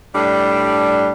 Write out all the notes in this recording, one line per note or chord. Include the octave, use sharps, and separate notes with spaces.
A2 G3 D4